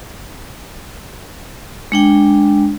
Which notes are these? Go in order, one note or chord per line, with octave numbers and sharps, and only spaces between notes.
G#3 D4 G5